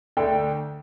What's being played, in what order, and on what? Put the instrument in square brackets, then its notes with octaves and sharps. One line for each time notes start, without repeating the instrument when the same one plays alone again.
[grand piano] D2 D3 A3 D4 [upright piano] G5